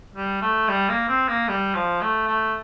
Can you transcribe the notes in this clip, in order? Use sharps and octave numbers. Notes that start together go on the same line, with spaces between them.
G3
A3
G3
A#3
C4
A#3
G3
F3
A3
A3